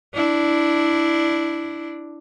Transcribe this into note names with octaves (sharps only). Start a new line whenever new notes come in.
D4 E4